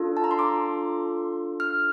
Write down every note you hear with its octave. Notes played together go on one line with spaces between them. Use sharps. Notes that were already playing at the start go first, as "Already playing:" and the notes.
Already playing: D4 F4 A4
A5
A#5
C6
D6
F6